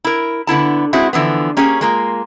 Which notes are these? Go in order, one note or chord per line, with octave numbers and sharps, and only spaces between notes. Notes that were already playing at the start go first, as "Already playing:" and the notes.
E4 A#4
D3 B3 E4 A5
G#3 C4 E4 F#4 G#4
D3 E3 F3 B3
A#3 C#4 G4 G#4 C#5
G#3 A#3 F4